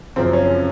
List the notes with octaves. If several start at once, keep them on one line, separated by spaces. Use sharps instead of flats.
F#2 C#3 F3 C4
C#4